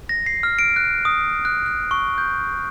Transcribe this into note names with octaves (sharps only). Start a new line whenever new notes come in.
A#6
C7
F6
D7
F#6
D#6
F#6
F#6
C#6
G6